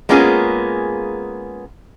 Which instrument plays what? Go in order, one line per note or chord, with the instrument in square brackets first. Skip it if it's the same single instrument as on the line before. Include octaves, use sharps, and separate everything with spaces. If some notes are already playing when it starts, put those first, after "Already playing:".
[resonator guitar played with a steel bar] G#3 A#3 B3 C#4 F4 G#4